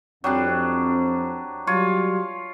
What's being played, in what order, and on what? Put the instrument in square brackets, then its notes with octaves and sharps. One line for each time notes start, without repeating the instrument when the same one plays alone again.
[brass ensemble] F2 C4 [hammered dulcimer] F#3 G3 D4
[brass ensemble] F#3 G3 [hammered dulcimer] F4 C#5